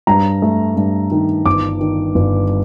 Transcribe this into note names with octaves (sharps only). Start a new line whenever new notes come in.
G2 A#5
A3
G2
D#3
G1 D6
D#3
G1